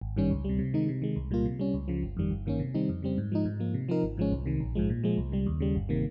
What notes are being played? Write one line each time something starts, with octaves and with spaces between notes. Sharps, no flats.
G#1
G2 D#3 G3 C#4
C#2
C3 G3
C3
D#3 G#3 D#4
C3
D#3 G#3
C2
A#2 G3 A#3 F4
C3
G3 C#4
C#2
C#3 F3
G1
F2 D#3 G3
G1
G2 D#3 A#3 C#4
C3
D#3 G3 C4 D#4
F2
C#3 G3 C4
G#2
F3 G#3 D#4
G#2
F3 A#3
C3
F3 C4 D#4 A#4
G#1
G#2 F3 G#3 C#4
C2
C3 D#3
A#1
G#2 F3 G#3
A#2
F3 G#3
C2
C3 G3
D#2
C#3 G3
G1
C3 D#3 A#3